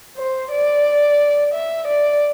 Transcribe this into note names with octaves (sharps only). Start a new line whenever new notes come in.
C5
D5
E5
D5